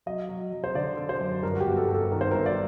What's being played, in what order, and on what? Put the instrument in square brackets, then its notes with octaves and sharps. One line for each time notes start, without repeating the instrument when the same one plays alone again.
[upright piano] F#3 D#5
F#3
F#3
C5
D3 D5
D3
C5
F#2
G2 A#4
F#4
G4
G1
A4
G2
A4
D#3 A#4
C5
G1 A#4
D5